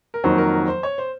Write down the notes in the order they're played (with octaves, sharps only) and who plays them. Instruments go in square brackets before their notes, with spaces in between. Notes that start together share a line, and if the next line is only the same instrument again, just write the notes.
[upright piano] A#4
[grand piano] F2 D#3 F#3 A#3 D#4 [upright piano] C5
[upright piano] A#4
A#4
C5
C#5
C5